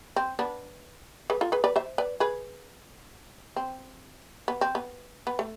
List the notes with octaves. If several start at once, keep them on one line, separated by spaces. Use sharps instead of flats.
C4
B3 D4
G#4 B4
F4 A4
G#4 B4
B4 D5
C5 E5
B4 D5
G#4 B4
C4
B3
C4
B3
B3
A3